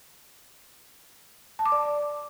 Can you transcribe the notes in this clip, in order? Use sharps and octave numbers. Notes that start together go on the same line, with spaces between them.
A5
D6
D5